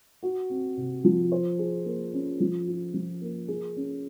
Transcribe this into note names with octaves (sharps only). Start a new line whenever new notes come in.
F#4
C4
C3
F3
C5
G#4
A#3
C#4
F3
F4
F3
A#3
G#4
C#4